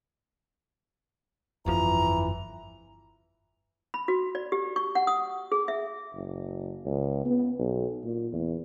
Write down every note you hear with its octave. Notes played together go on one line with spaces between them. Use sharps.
G1 F2 E3 F3 A#5
B5
F#4
D5
G4
C#6
F#5
D#6
G#4
E5
F#1
C#2
B3
B1
A#2
E2